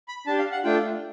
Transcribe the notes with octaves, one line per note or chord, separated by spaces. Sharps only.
B5
D4 G4 A5
F5
F#5
A3 D4 F4 G5